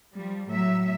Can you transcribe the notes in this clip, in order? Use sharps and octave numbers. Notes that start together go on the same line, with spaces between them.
F3 G3
A2 F#3 E5